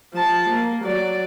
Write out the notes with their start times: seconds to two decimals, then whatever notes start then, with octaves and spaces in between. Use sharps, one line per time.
0.14 F3 A5
0.50 A#3
0.84 F#3 D5